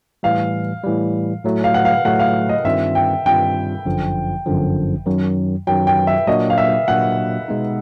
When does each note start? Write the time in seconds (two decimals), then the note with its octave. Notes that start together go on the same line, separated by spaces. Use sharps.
0.23 A2 E3 G3 F5
0.84 A2 E3 G3
1.45 A2 F#3 A3
1.64 F5
1.74 F#5
1.85 F5
2.05 A2 F#3 A3 F#5
2.19 F5
2.49 D#5
2.64 G2 D#3 G3 C4 F4 E5
2.95 G5
3.25 G2 D#3 G3 C4 F4 G5
3.85 G1 F#2 D3 F3
4.46 G1 F#2 D3 F3
5.06 F#2 D#3 F#3
5.67 F#2 D#3 F#3 G5
5.87 G5
6.07 E5
6.27 A#2 F#3 A#3 D4 F#4 D#5
6.50 F5
6.58 E5
6.88 A#2 F#3 A#3 D4 F#4 F#5
7.48 B2 G#3 B3 D#4